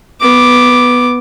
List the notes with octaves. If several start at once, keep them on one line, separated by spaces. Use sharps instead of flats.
B3 D6